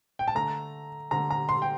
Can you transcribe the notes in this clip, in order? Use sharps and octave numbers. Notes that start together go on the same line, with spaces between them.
G5
A5
D3 A3 A#5
D3 A3 A#5
A#5
C6
G5